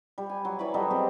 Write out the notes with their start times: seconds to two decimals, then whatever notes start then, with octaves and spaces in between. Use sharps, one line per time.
0.18 G3
0.30 G#5
0.45 F#3
0.59 E3 C#5 D5 B5
0.74 F#3 G3 A4 D#5
0.90 C4 G4 G#4